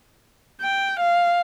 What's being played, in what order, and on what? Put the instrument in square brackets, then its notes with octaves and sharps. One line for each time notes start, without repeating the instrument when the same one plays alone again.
[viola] G5
F5